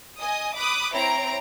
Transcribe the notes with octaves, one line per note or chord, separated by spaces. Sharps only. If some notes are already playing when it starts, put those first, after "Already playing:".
D#5 G#5 D#6
B5 D6 D#6 F#6
C4 E4 C#5 A#5 D7